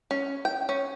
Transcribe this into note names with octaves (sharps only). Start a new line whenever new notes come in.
C#4
G5
C#4